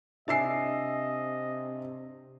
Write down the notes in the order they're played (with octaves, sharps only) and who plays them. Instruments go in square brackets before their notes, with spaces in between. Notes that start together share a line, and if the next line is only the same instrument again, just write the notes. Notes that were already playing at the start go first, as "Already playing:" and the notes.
[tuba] C3 [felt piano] D4 E6 C7 [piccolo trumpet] D#5 [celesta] E5 G#5